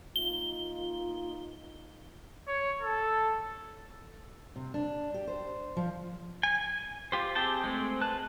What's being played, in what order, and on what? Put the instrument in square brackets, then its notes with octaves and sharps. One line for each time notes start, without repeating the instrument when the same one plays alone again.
[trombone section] A#3 D#4 F4 [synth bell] G7
[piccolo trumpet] C#5
A4
[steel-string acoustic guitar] C3
D4
G4
C5
F3
[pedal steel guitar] G#5
F4 G4 C5
C4 G4 G#4 G5 A5
G#3 A3 C4
B4 A5 F#6